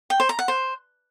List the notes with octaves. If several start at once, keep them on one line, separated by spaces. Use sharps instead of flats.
G5
C5
A#5
F#5
C5